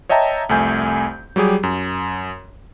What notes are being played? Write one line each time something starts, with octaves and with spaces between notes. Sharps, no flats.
C#5 D#5 E5 G5 A5 A#5
C2 F2 A3 G#5 G6
F#3 G3 G4 G#4
F#2